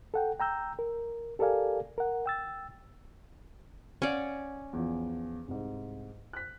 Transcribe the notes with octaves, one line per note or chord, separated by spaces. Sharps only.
A4 F#5 G5
G5 A#5 E6 G6
A#4
G4 A4 A#4 D5 F5 G#5
A#4 F#5
G5 E6 A6
C#4 D5 F5 F#5
E2 F3
C2 G#2
F#6 B6